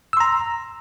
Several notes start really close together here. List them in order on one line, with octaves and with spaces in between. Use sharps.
E6 C6 A#5